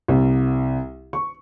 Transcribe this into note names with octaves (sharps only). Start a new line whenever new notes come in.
C2
C#6